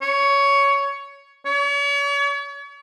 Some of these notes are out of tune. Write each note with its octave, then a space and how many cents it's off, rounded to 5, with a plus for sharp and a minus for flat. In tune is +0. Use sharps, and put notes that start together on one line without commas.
C#5 +15
C#5 +40